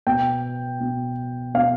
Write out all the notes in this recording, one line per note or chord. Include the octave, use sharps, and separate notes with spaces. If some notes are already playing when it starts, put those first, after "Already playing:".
B2 G5
B2
B2 F5